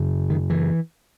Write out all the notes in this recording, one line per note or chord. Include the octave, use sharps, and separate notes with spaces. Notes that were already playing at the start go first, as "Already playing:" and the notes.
Already playing: F#2 C#3
D#3
E3